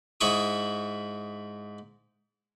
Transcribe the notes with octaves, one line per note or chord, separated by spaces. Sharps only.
G#2 E4 B5 C#6 D#6